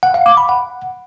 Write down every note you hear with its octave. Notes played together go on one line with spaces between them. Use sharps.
F#5
F5
D6
B5
F#5